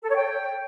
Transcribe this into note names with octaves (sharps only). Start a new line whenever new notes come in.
A4
C#5
G5